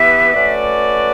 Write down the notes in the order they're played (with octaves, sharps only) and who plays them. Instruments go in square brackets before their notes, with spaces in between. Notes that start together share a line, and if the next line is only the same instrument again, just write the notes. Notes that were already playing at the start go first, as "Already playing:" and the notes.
Already playing: [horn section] E3 B3 E4 G4 B4 [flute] E5
[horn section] A3 C#4 F#4 B4 D5